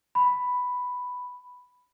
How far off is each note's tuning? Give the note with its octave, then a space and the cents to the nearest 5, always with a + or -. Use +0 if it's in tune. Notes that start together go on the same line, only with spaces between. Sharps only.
B5 +5